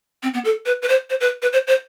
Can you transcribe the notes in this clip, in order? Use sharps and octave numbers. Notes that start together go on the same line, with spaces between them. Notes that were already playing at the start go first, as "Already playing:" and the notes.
C4
B3
A4
B4
B4
C5
C5
B4
B4
C5
C5